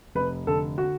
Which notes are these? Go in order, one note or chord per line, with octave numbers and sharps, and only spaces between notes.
F1 B4
D3 A4
F#4